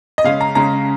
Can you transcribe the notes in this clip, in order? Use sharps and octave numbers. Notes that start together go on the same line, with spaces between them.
D#5
C#3 G#3 C#4 F5
A#5
C#3 G#3 C#4 A#5